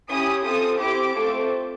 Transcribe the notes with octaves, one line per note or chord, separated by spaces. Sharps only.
C#4 E4 G4 D#6
C4 F4 A4 D#6
C4 E4 G4 D6
A3 C4 F4 A4